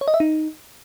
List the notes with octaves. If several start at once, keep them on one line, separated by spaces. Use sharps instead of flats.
C#5
D#5
E5
D#4